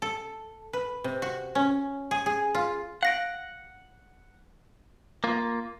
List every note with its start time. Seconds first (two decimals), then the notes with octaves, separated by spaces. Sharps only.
0.02 A4
0.73 B4
1.04 C3
1.22 F#4
1.55 C#4
2.11 G#4
2.26 G#4
2.55 F4
3.03 F5 F#5 A#6 D7
5.24 A#3 F4